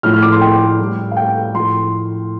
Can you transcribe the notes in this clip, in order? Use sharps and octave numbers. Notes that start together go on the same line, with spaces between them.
A2 F3 F6
F6
D6
C6
G5
A2 G3
F5
G5
A2 F3 C6